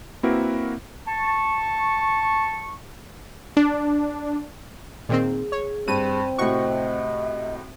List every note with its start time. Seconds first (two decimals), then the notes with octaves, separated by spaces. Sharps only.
0.23 A#3 C4 E4 F#4 A#4 B4
1.06 A5 C#6
3.57 D4
5.09 A#2 D#3 C4 G#4
5.52 C#5
5.88 G2 C4 D#7
6.38 A2 C3 F#4 D#5 C#6